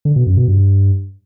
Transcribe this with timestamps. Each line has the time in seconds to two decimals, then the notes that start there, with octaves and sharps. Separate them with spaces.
0.05 D3
0.16 B2
0.27 F#2
0.37 B2
0.48 G2